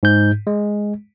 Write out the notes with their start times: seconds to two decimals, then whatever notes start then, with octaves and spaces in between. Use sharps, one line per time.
0.03 G#2 G6
0.47 G#3